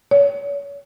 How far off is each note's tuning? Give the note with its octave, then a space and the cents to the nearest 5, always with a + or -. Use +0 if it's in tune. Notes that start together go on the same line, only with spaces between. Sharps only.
C#5 +35